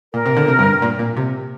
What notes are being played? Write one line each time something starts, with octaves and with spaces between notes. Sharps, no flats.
A#2 A#4
C3
D3
C3
G2
A#2
A#2
C3